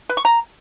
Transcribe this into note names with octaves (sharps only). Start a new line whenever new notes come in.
B4
C#6
A#5